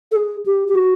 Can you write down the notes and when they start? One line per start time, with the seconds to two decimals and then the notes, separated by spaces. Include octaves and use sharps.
0.12 A4
0.16 G#4
0.46 G4
0.68 G4
0.75 F#4